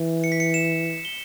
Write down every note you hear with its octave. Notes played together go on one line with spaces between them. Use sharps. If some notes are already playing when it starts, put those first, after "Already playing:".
Already playing: E3
C#7
B6
C#7
E7
G7